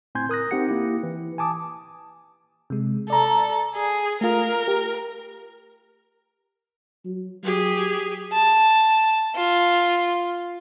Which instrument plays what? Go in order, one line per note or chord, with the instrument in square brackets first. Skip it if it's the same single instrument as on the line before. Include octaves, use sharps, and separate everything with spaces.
[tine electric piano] A2 C4 G#5 C6 G6 G#6
A#4 D#6 F#6 A#6
C4 D#4 G4 F#5 C#7
A#3 E4 G4
E3
G#5 A5 D6 D#6
[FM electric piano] C3 G#3
[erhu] A4 [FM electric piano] D5 A#5
[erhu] G#4
[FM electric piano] A3 F4 [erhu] A#4
[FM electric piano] G4
[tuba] F#3
[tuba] F#3 [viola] G4 G#4
[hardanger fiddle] A5
F4